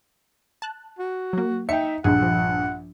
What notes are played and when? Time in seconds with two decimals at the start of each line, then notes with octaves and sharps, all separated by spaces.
0.62 A5 F#6
0.99 F#4
1.33 F#3 A#3
1.69 D#4 E5 G5 C#7
2.04 A#1 G2 G#4 F#5
2.22 F3